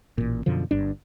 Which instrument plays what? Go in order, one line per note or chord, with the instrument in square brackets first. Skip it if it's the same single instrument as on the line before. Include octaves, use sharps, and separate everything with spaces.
[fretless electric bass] A1 A#2
F#2 B2 D3 F3
G1 G2 D4